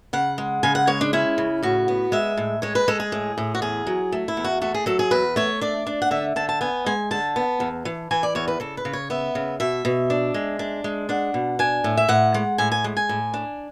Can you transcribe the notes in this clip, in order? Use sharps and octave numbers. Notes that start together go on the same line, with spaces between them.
C#3 F#5
G#3
C#3 G#5
F#5
G#3 C#5
D4
C#4 E4
C#3
A2 F#4
B3
G#3 E5
A2
G#3 C#5
B4
G#3 A4
G#4
A2
A2
F#4
E2 G#4
F#3
A3
E4
E2
F#4
A3 F#4
G#4
F#3 A4
G#4
E2 B4
A3 C#5
D4 D5
D4
F#5
D3 E5
D3 A5
A5
B3 G#5
G#3 G#5
D3 A5
B3
E2
E3
E3 G#5
D5
E2 C#5
B4
C#3 A4
B4
C#3
C#5
B3 E5
C#3
B2 E5
B2
D4
G#3
D4
G#3
D4 F#5
B2
D4 G#5
A2
E5
A2 F#5
G#3
A2 G#5
G#5
G#3
G#5
A2
D4